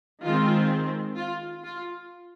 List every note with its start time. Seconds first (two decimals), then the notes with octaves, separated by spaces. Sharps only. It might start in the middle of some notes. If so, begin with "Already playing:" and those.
0.23 D#3 G#3 C4 F4
1.17 F4
1.64 F4